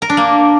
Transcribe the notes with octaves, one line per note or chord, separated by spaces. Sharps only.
A#4
D4
A#3